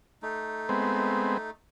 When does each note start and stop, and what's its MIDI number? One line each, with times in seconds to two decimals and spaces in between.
0.23 1.50 57
0.23 1.50 63
0.69 1.38 56
0.69 1.38 59
0.69 1.38 60